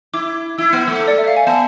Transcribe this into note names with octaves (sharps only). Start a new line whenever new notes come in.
E4 D6
E4 E6
B3 F6
A3 E6
D5
E5
F5
G#5
B3 A5